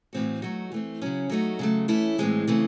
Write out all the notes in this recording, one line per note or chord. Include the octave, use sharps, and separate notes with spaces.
A2 E3 C4 F#4
F#3 A3 D#4 F#4
E3 A3 C4
C#3 F#3 C#4
F#3 A3 D#4 F#4
C#3 F#3 A3
E3 A3 C#4 E4
A2 E3 G#3 C4
C#3 E3 A3 C4